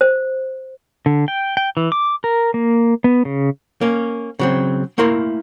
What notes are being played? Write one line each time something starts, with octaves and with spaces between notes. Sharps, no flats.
C5
D3
G5
G5
E3
D6
A#4
A#3
B3
C#3
A#3 C#4
C#3 F#3 C4
A3 A#3 E4 A#4 C6